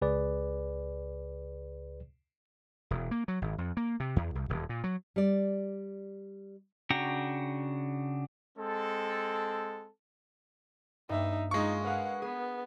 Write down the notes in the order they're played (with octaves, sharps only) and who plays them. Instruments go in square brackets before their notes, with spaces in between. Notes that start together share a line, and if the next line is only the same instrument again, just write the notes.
[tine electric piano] C#2 G#4 B4 D5
[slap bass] E1
A#3
F#3
G#1
F2
A#3
C3
E2
C2
D#1
A#2
F#3
[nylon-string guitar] G3 D5
[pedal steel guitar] C#3 D4 F#4 G5 A#5
[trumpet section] G#3 C4 A4
[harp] G2 A#3 [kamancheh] D#4 E5
[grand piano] G#3 C#6 [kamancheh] D#4 F4
[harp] G#4 A#4 B4 [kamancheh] F5 F#5
[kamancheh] B3 [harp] G#4